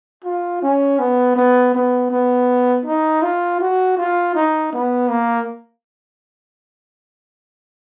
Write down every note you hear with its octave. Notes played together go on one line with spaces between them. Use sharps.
F4
C#4
B3
B3
B3
B3
D#4
F4
F#4
F4
D#4
B3
A#3